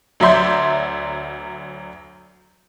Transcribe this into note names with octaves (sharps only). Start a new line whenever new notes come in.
D2 F#3 D5 E5 C6 G6